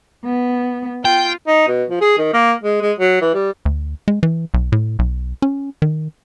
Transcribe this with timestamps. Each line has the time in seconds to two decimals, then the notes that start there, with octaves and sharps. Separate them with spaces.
0.24 B3
1.05 F4 G5
1.47 D#4
1.67 B2
1.90 F3
2.01 G#4
2.18 D#3
2.33 A#3
2.63 G#3
2.82 G#3
2.99 F#3
3.21 E3
3.34 G3
3.65 D2
4.08 G#3
4.23 E3
4.54 B1
4.72 A2
4.99 B1
5.42 C#4
5.82 D#3